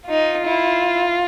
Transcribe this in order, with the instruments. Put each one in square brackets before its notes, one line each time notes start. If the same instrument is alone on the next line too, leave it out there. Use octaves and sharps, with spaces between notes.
[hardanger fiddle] D#4 [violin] F4
[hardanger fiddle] E4